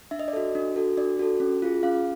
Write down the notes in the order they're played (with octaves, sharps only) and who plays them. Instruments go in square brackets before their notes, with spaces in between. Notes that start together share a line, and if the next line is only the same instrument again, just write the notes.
[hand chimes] D4 E5
D#5
D5
F#4 A4 D#5
D4
F#4 A4
D4 D5
F#4 A4
C#4
F4 G#4
C#4 F5